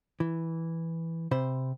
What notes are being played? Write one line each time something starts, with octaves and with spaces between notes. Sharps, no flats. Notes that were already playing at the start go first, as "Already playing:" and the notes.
E3
C3 C5 B5